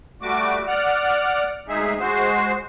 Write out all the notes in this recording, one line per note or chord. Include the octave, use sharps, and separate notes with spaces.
G3 A3 F#4 D6
D5 F#5 F6
D2 G#3 D#4 G#4 E5
G#3 F#4 C5